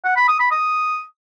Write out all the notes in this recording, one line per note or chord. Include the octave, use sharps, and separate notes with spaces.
F#5
B5
D#6
B5
D#6